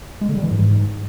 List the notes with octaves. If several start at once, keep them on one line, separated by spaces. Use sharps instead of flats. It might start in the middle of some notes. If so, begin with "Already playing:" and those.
G#3
D3
G3
E3
G#2